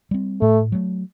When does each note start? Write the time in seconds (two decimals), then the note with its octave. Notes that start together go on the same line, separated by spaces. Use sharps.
0.11 G3 C4
0.41 A2 A3
0.72 F#3 A3